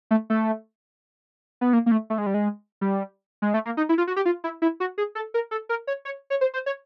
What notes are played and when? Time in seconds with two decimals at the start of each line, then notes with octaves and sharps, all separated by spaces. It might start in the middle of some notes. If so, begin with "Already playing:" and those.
0.11 A3
0.30 A3
1.61 B3
1.73 A#3
1.86 A#3
1.92 A3
2.10 A3
2.18 G#3
2.26 G3
2.34 G#3
2.81 G3
3.42 G#3
3.54 A3
3.65 A#3
3.77 D#4
3.89 E4
3.98 F4
4.07 F#4
4.16 G4
4.26 F4
4.44 E4
4.62 E4
4.80 F#4
4.98 G#4
5.15 A4
5.34 A#4
5.51 A4
5.69 A#4
5.87 C#5
6.05 C#5
6.30 C#5
6.41 C5
6.54 C5
6.66 C#5